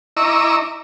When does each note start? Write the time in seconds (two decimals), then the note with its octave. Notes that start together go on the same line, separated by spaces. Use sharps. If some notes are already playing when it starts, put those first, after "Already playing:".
0.17 E4 D#5 A#5 C#6 D6 E6